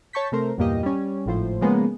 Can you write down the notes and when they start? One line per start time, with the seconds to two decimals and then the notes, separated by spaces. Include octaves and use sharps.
0.13 C#5 A5 C#6 G6 B6
0.32 C3 A3 A#4 C5 A#5
0.58 E2 G2 A#2 A#3 G4 D#5
0.83 G3 C#4
1.26 G#1 A2 F3 C5
1.61 C#3 F3 G#3 A#3 B3